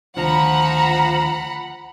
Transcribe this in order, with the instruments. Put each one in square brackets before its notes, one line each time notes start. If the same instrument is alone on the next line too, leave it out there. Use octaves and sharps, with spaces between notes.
[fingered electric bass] D2 D#3 D4 [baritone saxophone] F3 [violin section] F#5 B5 [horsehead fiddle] A#5